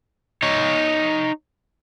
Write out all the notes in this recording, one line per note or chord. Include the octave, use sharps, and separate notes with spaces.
D#4 C#5